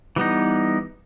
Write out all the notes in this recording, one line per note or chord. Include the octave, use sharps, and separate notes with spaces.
E3 G3 B3 D#4